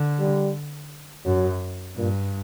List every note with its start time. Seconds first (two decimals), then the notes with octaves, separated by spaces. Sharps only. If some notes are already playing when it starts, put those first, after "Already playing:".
Already playing: D3
0.19 G3
1.25 F#2 F#3
1.97 G2 A#2